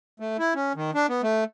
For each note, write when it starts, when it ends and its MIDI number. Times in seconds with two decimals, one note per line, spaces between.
0.20 0.37 57
0.39 0.54 64
0.55 0.73 61
0.76 0.91 51
0.95 1.06 62
1.09 1.22 59
1.23 1.44 57